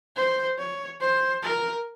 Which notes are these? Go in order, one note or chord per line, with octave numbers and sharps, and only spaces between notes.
C5
C#5
C5
A#4